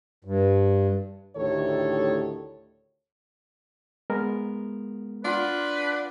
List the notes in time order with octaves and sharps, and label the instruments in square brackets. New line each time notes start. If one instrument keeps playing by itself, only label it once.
[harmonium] G2
[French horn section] D2 A2 D#3 G4 A4 C#5
[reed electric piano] G#3 B3 A#4
[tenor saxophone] D4 [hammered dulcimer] F4 F#5 C6 [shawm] B4